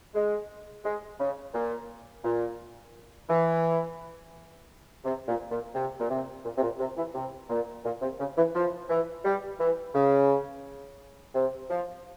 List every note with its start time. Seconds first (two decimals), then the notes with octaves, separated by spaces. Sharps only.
0.15 G#3
0.85 G#3
1.20 C#3
1.54 A#2
2.25 A#2
3.29 E3
5.05 C3
5.28 A#2
5.51 A#2
5.75 C3
6.00 A#2
6.10 C3
6.45 A#2
6.58 C3
6.63 A#2
6.80 C3
6.97 E3
7.15 C3
7.50 A#2
7.85 A#2
8.02 C3
8.20 C#3
8.37 E3
8.55 F3
8.90 E3
9.25 G3
9.60 E3
9.94 C#3
11.35 C3
11.70 F3